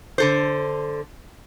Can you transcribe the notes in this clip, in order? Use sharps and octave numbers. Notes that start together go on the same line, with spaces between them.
D3 A4 C5